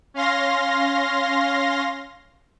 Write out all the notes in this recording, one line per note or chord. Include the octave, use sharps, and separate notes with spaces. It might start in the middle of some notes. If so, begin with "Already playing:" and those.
C#4 F5 C6 A#6